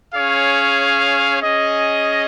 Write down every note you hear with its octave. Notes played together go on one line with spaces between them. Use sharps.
C#4 G#4 C#5 F5
C#4 G#4 D#5